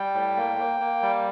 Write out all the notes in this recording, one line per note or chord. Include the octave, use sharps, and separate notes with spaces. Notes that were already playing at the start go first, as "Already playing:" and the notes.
Already playing: G3 G5
A2
A#3
A#3
A#3
G3